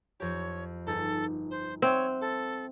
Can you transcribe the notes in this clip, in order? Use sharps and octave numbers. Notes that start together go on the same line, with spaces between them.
F2 G4 C#5
G1 D#4 G#4 A4
C5
C4 C#5 E5 F#5
A4